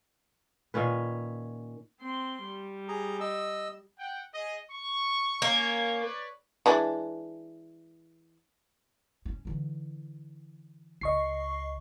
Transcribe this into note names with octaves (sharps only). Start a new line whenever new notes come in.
A#2 D#3 C#4 B4
C4 C6
G3
G#4 A#5
D#5 E6
F#5 G5
G#4 D#5
C#6
A#3 C#4 C#5
B4 C#5 D5
E3 G#3 D4
C4 C#4
D3 E3
C#2 D#5 C#6 C7